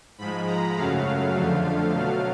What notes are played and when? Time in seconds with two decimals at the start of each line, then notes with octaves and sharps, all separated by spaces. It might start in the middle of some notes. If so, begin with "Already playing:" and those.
0.18 G#2 F3 G#3 B5
0.47 A#5
0.76 F#2 C#3 F#3 A3 F5
1.34 F2 D3 F3 A3
1.91 B2 F#3 A3